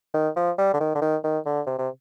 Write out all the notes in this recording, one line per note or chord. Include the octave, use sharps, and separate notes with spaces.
D#3
F3
G3
D3
D#3
D3
D#3
D#3
D3
C3
C3